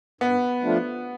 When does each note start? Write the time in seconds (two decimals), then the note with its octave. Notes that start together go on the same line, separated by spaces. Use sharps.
0.21 G2 B3
0.63 F3 A3 D4 F4